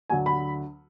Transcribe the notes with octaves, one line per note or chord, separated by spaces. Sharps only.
D2 D3 F#3 G#5
B5